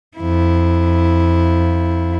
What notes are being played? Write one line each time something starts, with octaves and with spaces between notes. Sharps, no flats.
F2 E4